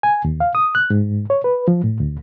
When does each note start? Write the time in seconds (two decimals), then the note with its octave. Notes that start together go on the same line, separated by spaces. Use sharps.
0.03 G#5
0.25 D#2
0.40 F5
0.55 D#6
0.75 F#6
0.90 G#2
1.30 C#5
1.44 B4
1.68 F3
1.84 A2
2.00 D2